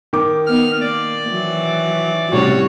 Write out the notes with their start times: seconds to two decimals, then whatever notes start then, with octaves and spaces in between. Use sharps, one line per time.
0.13 D#3 D6
0.46 B3 D#4 F6
0.81 A#3 D5
1.29 E3 F#3
2.32 A2 C3 G3 C#4 F#4 C#5